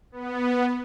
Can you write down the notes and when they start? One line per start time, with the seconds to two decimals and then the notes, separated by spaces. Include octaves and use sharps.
0.12 B3